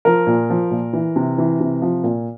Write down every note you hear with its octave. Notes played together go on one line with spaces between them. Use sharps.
F3 A#4
A#2
F3
A#2
E3
C3
E3
C3
F3
A#2